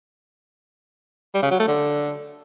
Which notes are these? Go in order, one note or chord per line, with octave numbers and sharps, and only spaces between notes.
G3
C#3
F#3
A3
D3